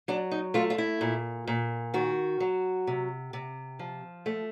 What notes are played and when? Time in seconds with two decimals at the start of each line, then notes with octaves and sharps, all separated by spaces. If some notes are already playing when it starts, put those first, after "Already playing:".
0.08 F#3 D4
0.31 D#4
0.54 A3 F4
0.70 F4
0.78 E4
1.01 A#2
1.47 A#2
1.94 D#3 F#4
2.40 F#3
2.87 C3
3.33 C3
3.79 F3
4.26 A3